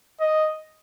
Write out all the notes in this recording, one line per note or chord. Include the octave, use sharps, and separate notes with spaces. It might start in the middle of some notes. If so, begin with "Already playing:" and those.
D#5